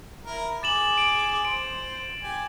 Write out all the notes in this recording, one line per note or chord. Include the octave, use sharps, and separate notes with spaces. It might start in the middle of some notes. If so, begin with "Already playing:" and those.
E4 A#4
G#4 D6 A6 E7 F#7
D7
C5 D7
G4 G#5